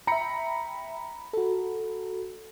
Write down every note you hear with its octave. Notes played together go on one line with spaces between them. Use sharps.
E5 G5 A#5 B5 C#7
F#4 A4